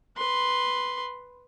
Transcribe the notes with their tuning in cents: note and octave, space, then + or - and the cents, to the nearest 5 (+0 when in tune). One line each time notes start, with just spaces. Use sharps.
B4 +0 C6 +0